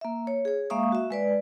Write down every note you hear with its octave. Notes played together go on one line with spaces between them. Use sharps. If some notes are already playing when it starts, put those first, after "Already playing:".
A#3 E5
C#5
G#4 C#5
G#3 A#3 E5 F5 C#6 D#6
F#4 E5
G#3 B4 D5